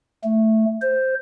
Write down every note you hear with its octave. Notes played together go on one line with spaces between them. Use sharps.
A3
C5